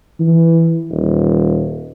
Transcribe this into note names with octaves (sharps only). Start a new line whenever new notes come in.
E3
D#1